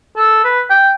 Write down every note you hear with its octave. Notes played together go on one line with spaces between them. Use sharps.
A4
B4
G5